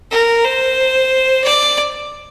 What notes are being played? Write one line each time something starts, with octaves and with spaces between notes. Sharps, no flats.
A#4
C5
D5